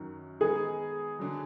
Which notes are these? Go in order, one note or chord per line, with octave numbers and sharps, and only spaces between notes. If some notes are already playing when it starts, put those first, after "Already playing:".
Already playing: F#2 D#3 F#3
D#3 G#3 B3 D#4 G#4
D3 F#3